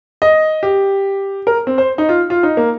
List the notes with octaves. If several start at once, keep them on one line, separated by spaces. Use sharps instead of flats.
D#5
G4
A#4
C4
C5
D#4
F4
F4
D#4
A#3